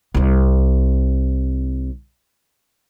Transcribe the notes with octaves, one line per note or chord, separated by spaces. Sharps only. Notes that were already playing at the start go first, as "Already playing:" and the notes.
C2 C4